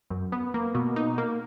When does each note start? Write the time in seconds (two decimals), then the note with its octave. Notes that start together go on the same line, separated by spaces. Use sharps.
0.10 F#2
0.32 B3
0.54 A#3
0.75 B2
0.96 D#4
1.18 A#3